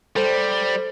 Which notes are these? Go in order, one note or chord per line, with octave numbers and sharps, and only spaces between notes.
G3 A4 C5